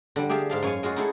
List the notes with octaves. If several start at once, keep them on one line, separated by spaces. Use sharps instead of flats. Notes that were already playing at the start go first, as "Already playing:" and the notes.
D3 G3
G4 G#4 E5 F5 A5
G#2 F5 A5
F#2 C#5 F5 G#5
G#3 F4 F#4 G#4
D#4 E4 G#4 A4